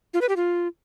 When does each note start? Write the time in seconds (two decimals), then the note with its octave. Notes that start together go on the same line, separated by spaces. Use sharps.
0.14 F4
0.21 B4
0.29 G4
0.36 F4